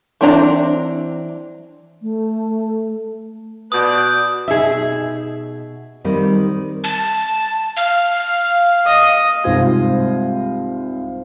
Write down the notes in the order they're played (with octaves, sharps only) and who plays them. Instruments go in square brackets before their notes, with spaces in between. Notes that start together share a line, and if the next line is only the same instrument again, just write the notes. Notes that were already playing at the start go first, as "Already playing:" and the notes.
[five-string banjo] E3 C4 D4 A#5
[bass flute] A3
[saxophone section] B2 B4 D5 [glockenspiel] D#6 G6
[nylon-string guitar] B2 D#4 [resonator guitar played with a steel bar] G#4 E5
[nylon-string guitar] D#3 G3 C4
[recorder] A5
F5
[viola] D#5
[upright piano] C2 G#2 F4 C5 F5 G#6